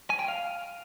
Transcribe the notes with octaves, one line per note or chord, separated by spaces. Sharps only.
G#5
G5
F5